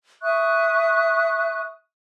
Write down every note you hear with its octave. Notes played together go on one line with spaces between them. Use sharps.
E5 C#6 D#6 F#6